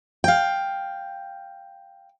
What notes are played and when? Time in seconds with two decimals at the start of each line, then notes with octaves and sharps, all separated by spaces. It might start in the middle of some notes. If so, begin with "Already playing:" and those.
0.24 F5 G5